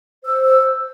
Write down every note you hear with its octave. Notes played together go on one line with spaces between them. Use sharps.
C5 E6
E6